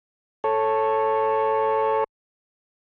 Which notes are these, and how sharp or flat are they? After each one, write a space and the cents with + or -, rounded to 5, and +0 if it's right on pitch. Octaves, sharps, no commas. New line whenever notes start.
A4 +0 C#5 -10